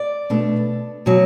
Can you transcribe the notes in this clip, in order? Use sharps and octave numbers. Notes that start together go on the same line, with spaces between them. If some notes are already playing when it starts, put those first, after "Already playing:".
Already playing: D5
B2 A3 D4
B2 F#3